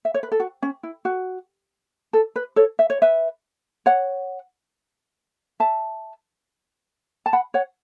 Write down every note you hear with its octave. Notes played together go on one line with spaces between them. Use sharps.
E5
C#5
B4
A4
F#4
C#4
E4
F#4
A4
B4
A4 C#5
E5
C#5
B4 E5
C#5 F#5
E5 A5
A5
F#5 B5
C#5 F#5